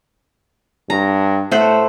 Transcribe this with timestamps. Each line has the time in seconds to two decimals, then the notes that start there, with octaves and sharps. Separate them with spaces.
0.90 G2 A#5
1.51 A2 A3 C5 F#5